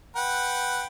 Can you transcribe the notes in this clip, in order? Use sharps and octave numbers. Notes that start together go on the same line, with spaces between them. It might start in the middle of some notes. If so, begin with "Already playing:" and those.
B4 F#5 G5